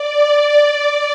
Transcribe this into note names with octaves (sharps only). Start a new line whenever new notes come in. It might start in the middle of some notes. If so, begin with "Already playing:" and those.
Already playing: D5